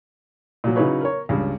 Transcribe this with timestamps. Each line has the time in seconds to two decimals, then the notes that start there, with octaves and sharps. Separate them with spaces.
0.64 A#2 F#3
0.76 C#3 F#3 D#4 E4 B4 C#5
1.01 A#4 C#5
1.29 C#2 G2